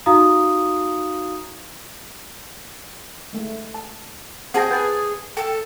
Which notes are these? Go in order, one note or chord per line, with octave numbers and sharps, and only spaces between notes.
D#4 F#4 F5 A#5 D#6
G#3 A3
A5
C4 G4 G#4 F#5 G5 A5 A#6
B4 G6 A6
A4 G5